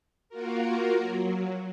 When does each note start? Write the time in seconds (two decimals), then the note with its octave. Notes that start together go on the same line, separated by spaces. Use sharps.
0.29 A#3 F4 F#4 A#4
0.98 F#3